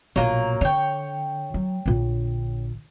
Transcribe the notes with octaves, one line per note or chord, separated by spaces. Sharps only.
A#1 B2 F#3 A#3
D3 C#5 G5
F#3
A#1 D3